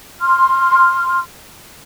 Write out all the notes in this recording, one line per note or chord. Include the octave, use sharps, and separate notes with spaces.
C6 F6